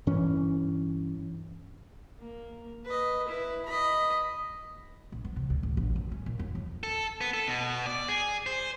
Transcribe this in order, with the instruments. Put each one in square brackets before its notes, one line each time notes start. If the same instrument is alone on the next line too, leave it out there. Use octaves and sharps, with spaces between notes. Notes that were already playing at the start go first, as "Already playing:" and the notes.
[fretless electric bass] G2 E3 C#4
[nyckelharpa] A#3
B4 D#5
E4 B4
D#5 B5
[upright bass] A#1
B3
C3
D2
A1
A#1
F#2
C#4
A#2
D#2
F2
[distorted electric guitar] A4
B3
A4
B2
D5
G#4
C5